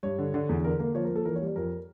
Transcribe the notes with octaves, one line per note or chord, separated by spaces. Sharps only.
G2 C#5
D3
D3
E2
D3 A#4
A#3 A#4
F3 C#5
A#4
A#3
A4
E3 A#4
C#5
G3
D5
F2 A#4